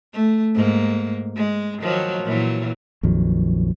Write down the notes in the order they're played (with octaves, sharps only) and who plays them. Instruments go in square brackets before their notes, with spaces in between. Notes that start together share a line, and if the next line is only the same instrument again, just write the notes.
[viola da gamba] A3
G#2 A#3
G#3
D#3 F3 F#3
A#2 E3 F#3
[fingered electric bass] A#1 F2 D#3 F#3